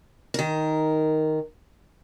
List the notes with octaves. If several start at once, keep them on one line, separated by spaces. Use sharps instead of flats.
D#3 A#4